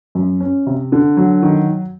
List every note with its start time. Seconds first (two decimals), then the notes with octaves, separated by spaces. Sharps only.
0.15 F#2
0.40 C#4
0.67 C3
0.92 D3
1.17 F#3
1.43 D#3